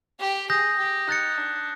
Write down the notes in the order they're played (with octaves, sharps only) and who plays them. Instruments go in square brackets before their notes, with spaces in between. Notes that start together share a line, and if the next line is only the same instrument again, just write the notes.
[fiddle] G4
[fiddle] G#4 [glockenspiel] D#6 G6 A#6
[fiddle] G4
[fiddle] D#4 [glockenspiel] F#6 A6 C#7
[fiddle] D4